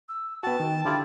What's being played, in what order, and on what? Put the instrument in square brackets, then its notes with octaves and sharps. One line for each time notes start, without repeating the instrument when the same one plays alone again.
[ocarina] E6
[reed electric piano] B3 F#4 [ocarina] G5 [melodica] A5
[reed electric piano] D#3
[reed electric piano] D3 G4 [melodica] E4 F4 D5